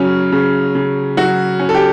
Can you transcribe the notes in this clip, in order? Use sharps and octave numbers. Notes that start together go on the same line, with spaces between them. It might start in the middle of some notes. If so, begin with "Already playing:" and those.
Already playing: C#3 F#3 C#4
C#3
C#3
F#3 F#4
C#4
A4
G4